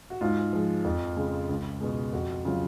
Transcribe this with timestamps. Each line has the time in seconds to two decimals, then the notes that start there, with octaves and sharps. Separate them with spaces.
0.10 F#4
0.21 G#2 F4
0.53 F3 G#3
0.84 F2
1.16 C#3 G#3
1.49 C#2
1.80 B2 G#3
2.13 F2 F#4
2.45 C#3 F#3 F4